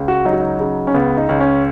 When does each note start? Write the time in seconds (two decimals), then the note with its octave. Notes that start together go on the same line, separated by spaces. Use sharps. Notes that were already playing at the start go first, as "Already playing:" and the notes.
Already playing: C#2
0.08 F#4
0.25 F#3 D#4
0.33 F#4
0.40 D#4
0.60 C#3
0.87 C#4
0.94 C#2 B3
1.17 D#4
1.29 C#2
1.40 C#4